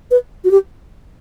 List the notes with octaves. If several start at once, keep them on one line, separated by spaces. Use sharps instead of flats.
B4
F#4
G4